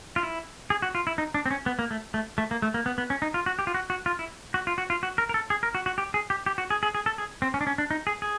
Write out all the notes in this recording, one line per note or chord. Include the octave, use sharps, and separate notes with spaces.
F4
E4
G#4
F#4
F4
E4
D#4
D4
C4
C#4
B3
A#3
A3
A3
A3
A#3
A3
A#3
B3
B3
C#4
D#4
F4
F#4
G4
F4
F#4
F#4
F4
E4
F#4
F4
F#4
F4
F#4
A#4
A#4
A4
G#4
A#4
F#4
F#4
G4
G#4
G4
G4
F#4
G#4
G#4
G#4
A4
G#4
C4
C#4
D4
C#4
D4
D#4
G#4
G#4